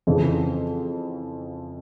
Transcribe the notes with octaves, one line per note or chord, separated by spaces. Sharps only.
F2 C#3 E3